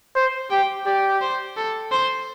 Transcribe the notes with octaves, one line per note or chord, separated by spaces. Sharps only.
C5
G4 G5
G4 D5
C5
A4
C5